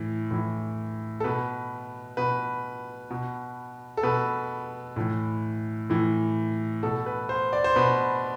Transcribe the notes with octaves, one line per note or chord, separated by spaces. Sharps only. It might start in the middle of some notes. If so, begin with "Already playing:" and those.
Already playing: A2 E3
A2 E3
A4
B2 B4
B2 B4
B2
A4
B2 B4
A2 E3
A2 E3
B2 A4
B4
C5
D5
C5
B2 B4